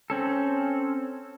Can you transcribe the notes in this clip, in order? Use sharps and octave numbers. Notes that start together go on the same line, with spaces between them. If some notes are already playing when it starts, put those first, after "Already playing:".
C4 C#4 A4